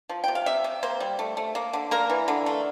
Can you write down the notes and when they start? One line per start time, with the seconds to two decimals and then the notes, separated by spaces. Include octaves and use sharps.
0.09 F3
0.24 C3 G5
0.35 F5
0.46 C3 E5
0.64 C3
0.83 A#3 C5
1.00 G3
1.19 A3
1.37 A3
1.55 A#3
1.73 D3
1.91 A#3 A#4
2.10 E3
2.28 D3
2.46 A3